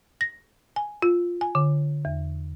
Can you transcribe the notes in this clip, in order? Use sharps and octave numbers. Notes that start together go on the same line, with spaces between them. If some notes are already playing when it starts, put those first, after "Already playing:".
A#6
G#5
F4
G#5
D3
E2